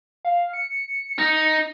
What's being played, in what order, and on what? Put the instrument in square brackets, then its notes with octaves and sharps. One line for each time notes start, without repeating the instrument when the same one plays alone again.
[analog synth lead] F5
C#7
[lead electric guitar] D#4